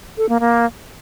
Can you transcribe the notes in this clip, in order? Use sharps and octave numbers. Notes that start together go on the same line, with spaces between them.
A4
A#3
A#3